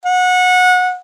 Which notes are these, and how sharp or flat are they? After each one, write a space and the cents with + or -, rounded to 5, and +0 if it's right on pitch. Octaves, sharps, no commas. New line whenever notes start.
F#5 -25